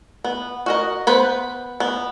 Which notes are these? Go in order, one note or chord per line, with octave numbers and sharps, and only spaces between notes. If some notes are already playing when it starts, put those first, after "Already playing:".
B3
F#4 A#4 D#5
B3 B4 C5
B3